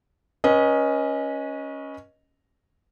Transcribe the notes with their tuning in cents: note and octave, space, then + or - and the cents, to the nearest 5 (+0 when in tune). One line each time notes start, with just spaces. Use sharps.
C#4 +0 B4 -35 D#5 +0